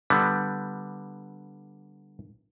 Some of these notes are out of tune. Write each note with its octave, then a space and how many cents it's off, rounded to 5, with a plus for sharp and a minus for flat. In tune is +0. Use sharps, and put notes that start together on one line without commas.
D3 +0 G3 +0 B3 +0